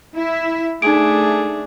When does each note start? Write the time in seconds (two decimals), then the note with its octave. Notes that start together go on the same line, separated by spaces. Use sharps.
0.15 E4 E5
0.82 A3 D4 D#4 G#4 D7